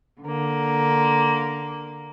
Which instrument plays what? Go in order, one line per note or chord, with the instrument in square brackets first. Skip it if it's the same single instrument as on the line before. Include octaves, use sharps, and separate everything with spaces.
[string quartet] D3 A#3